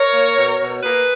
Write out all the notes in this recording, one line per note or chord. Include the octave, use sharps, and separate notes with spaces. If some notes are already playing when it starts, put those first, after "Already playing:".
Already playing: A#4 C#5
A#3
B2
B2
A#3 G#4 B4